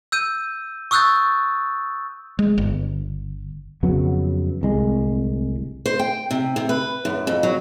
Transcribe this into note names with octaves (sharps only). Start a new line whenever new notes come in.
E6 G6 D#7
C#6 D#6 E6 F#6 G6 A6
G#3
G1
F2 C#3 F#3 B3
D1 C2 G#3
C5
G5
C3
C3
B4
F#2
F2
F#3